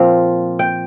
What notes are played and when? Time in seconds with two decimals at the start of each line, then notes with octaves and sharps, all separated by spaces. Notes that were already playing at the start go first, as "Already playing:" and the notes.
Already playing: A#2 F3 C4 F5
0.59 G5